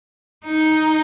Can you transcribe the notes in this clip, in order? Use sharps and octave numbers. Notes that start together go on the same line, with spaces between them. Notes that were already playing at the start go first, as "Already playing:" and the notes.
D#4